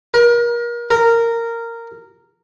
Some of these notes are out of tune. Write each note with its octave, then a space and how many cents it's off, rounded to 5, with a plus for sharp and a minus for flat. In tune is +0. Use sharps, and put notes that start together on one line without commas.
A#4 +35
A#4 -10